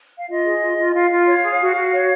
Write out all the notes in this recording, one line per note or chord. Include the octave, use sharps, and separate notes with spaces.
F5
F4 D#5
G#4
F4
F4
F4 F5
F4
C#5
G#4
F#4
F#4
C#5